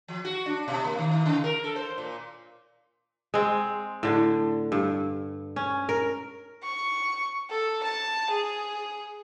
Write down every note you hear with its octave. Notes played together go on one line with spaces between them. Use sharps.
F3
F#4
D4
B2
A#3
D#3
D#3
C#3
A#4
A4
C5
A#2
G#3 C4
A2 D3
G2
C#4
A#4
C#6
A4
A5
G#4